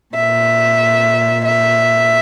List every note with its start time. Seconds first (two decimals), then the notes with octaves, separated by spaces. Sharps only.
0.14 A#2 E5
1.45 E5